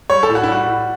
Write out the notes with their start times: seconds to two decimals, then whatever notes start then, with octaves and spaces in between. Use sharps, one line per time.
0.10 G3 C#5
0.23 A4
0.29 A2
0.35 F#4
0.43 E4
0.48 G3 F#4
0.66 A2